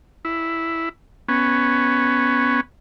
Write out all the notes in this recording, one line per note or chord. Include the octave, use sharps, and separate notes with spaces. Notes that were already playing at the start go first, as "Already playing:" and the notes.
E4
B3 C#4